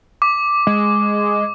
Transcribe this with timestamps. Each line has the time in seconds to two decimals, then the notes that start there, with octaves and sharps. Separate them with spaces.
0.22 D6
0.67 G#3